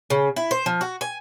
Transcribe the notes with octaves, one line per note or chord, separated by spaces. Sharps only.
C#3
E4
C5
F3
F#4
G#5